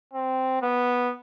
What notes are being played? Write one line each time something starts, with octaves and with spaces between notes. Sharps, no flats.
C4
B3